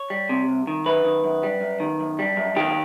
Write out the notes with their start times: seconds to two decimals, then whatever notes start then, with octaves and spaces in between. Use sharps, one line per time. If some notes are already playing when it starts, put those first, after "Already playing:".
Already playing: C#5
0.10 G3
0.29 C3
0.49 C2
0.67 D#3
0.85 F#2 B4
1.04 D#3
1.24 F#2
1.43 G3
1.61 F#2
1.80 D#3
2.00 F#2
2.19 G3
2.37 F#2
2.56 D#3 G4